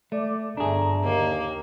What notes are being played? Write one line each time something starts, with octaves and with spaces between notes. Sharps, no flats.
A3 D5
G1 A3 D4 G#4 A#5
D#2 D3 A#3